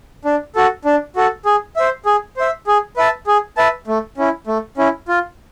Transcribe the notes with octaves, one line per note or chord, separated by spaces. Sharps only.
D4
F#4 A4
D4
F#4 A4
G#4
C5 E5
G#4
C5 E5
G#4
B4 E5 A5
G#4
B4 E5 A5
A3
C#4 E4
A3
C#4 E4
F4